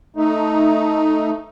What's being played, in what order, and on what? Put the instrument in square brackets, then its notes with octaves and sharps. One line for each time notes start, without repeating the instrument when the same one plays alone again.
[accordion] A3 D#4